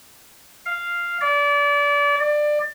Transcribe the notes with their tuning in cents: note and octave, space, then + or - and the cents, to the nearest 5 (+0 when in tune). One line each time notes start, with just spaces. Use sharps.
F5 -5
D5 -30
D5 +20